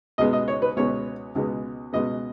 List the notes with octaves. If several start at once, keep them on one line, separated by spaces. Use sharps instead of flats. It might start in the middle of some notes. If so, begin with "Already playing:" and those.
C#2 B2 G#3 B3 D#5
D#5
C#5
B4
C#2 B2 G#3 B3 C#5
C#2 B2 G#3 B3
C#2 B2 G#3 B3 D#5